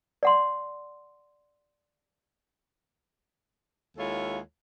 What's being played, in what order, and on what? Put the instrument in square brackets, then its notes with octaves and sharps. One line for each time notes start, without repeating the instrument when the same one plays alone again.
[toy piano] D5 F#5 C6
[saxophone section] D#2 G#3 E4 F4 A4 C#5